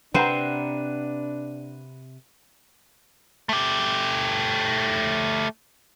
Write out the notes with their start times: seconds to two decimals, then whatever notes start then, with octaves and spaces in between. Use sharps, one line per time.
0.14 C3 C4 D4 B4 C5 F#5 A#5
3.49 A3 G4